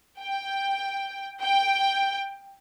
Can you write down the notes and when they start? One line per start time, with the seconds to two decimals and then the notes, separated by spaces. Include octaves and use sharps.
0.20 G5
1.42 G5